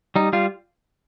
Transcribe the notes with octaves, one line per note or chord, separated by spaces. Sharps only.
G3 D#4
G3 F4